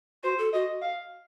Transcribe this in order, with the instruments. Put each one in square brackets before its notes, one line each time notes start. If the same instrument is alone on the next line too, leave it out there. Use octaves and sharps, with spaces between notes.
[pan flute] F#4 [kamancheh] C5
[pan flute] A4
[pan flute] F#4 [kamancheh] D#5
[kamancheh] F5